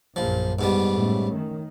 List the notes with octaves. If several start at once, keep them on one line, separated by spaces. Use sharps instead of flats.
A#1 F#2 F3
G#2 B2 G3
A2 A3 C#4
D#3